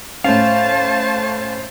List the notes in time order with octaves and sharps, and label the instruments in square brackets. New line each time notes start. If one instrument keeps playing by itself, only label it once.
[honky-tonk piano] A2 C#4 [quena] C5 [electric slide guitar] F5 [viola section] A5